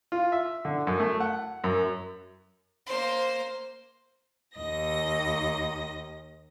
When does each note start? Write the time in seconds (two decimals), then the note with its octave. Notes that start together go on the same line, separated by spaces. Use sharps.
0.12 F4
0.32 E5
0.65 D3
0.87 F#2
1.00 A3
1.20 F#5
1.64 F#2
2.86 A#3 C5
4.57 D#2 D#5 A#6